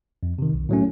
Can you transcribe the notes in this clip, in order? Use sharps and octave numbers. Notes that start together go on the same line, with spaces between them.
F2
C3 D#3
B1
A2 F#3 A3 C#4